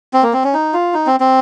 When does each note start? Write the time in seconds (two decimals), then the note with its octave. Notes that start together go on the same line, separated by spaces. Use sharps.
0.13 C4
0.23 A#3
0.33 C4
0.44 C#4
0.54 D#4
0.74 F4
0.94 D#4
1.06 C4
1.20 C4